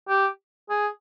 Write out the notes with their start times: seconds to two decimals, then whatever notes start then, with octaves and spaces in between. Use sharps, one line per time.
0.08 G4
0.69 G#4